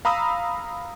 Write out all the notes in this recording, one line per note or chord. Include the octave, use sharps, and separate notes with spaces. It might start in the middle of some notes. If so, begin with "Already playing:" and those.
F5 A#5 B5 D#6 E6